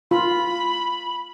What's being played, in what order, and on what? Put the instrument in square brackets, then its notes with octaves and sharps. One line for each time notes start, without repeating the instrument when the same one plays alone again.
[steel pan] F4 [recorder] B5